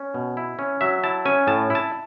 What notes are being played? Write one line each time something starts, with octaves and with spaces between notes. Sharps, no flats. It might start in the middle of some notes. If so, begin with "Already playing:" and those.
Already playing: C#4
B2
E4
C#4
F#3 E5
E4 A5
C#4 G#5
A2 A5
E4
A5